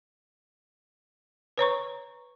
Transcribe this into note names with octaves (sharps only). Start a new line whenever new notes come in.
B4 C#5 A#5 C#6